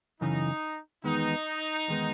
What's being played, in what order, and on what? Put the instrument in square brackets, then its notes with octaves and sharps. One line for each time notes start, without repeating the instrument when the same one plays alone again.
[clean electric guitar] F#2 C#3 E3 [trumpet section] D#4
[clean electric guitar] E2 D#3 G#3 B3 [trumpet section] D#4
[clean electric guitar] E2 D#3 G#3 B3